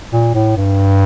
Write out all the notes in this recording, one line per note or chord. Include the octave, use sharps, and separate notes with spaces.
A#2
A2
G2